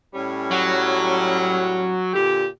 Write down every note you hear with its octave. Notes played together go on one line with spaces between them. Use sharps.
A2 G3 C#4
F#3
A#2 D3 G4